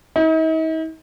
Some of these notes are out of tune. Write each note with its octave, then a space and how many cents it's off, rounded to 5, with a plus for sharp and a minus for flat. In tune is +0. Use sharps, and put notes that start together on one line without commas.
D#4 +45